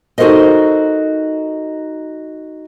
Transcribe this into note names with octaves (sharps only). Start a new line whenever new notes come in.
D#4 F#4 A4 A#4 C5 D#5